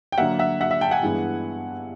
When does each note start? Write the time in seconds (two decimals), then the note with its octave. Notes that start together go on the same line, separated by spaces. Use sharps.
0.12 G5
0.18 D3 F#3 A#3 E5 F#5
0.39 E5 F#5
0.61 E5 F#5
0.71 E5
0.81 G5 A5
0.91 F#5 G#5
1.03 G2 E3 G#3 B3 E4